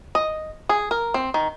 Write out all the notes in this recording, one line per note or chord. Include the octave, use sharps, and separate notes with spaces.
D#5
G#4
A#4
C4
D#3